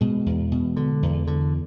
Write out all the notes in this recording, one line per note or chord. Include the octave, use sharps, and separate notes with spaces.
B2 G#3
E2
B2
D3
E2
D3